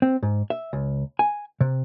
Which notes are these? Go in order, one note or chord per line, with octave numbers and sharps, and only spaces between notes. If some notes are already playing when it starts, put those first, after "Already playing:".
C4
G#2
E5
C#2
G#5
C3